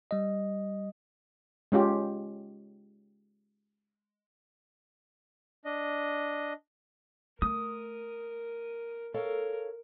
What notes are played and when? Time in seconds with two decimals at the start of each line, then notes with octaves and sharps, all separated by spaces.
0.11 G3 D#5
1.72 G#3 C#4 F4 G4
5.65 D4 D#5
7.42 A3 A#4 D#6
9.14 A4 A#4 C#5 F5